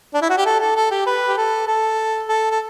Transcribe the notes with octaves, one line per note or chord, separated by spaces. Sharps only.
D4
E4
F#4
G4
A4
A4
A4
G4
B4
G4
A4
A4
A4
A4